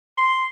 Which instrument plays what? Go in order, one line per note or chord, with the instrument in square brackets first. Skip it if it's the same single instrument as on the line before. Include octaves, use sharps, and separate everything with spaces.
[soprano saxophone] C6